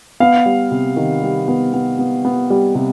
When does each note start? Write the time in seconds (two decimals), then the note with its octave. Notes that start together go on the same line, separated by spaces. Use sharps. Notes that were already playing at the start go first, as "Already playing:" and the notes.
0.20 B3 F5
0.46 G3
0.71 C3
0.96 D#3
1.23 G3
1.48 B3
1.73 B3
1.99 B3
2.25 B3
2.50 G3
2.75 C3